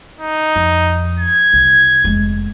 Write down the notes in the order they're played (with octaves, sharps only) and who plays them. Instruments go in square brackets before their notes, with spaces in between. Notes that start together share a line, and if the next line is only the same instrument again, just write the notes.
[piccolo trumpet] D#4
[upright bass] F2
[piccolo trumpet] G#6
[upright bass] C2
F1 G#3